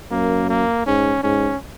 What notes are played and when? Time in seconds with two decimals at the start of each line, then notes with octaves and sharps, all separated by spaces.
0.11 F#2 A#3
0.49 A#3
0.86 G#2 C#4
1.23 G#2 C#4